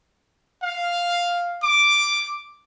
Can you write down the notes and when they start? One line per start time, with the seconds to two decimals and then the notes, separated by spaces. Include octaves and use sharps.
0.63 F5
1.63 D6